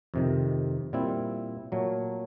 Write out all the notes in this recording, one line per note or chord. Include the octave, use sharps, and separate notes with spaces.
F2 C3 D#3
A#2 G3 C4 E4
A#2 F#3 A3